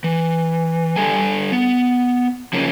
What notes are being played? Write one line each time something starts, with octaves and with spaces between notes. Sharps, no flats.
E3
D3 G3 A4 G#5
B3
C#3 F3 A#3 C#4